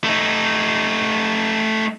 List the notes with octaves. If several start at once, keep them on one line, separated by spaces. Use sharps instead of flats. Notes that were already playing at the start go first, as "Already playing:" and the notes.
A3 D#4